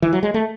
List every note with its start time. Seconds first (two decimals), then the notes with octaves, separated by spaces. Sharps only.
0.02 E3
0.13 F#3
0.23 G#3
0.34 A3